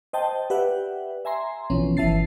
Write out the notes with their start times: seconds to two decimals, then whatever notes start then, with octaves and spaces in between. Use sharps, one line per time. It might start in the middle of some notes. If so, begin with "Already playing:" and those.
0.13 C5 D#5 G5 A5
0.50 G4 B4 D5 E5 F#5 G5
1.25 E5 G#5 A#5 C6
1.70 A#1 B2 E3 F3 C#4
1.97 G1 E3 E5 A5 A6 C7